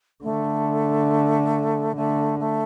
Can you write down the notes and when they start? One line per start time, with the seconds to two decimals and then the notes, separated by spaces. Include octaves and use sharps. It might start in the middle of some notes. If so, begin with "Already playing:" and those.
0.23 D3 A3
1.96 D3 A3
2.39 A3